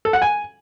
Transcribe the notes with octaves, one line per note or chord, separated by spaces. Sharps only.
A4
F#5
G#5